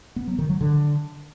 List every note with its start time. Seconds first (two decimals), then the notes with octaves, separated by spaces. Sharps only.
0.16 B3
0.27 F#3
0.38 D#3
0.50 F#3
0.61 D3